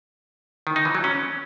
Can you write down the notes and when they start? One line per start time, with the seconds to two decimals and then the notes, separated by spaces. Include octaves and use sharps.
0.67 D#3
0.76 D#4
0.85 E3
0.95 F#3
1.04 C#4